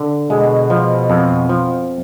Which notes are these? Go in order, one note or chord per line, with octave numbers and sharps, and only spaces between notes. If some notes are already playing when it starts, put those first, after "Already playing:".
Already playing: D3
B2 G#3
F3
F2
F3